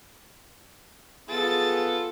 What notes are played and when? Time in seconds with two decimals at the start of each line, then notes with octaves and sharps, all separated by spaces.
1.29 B3 F4 G#4 A4 A6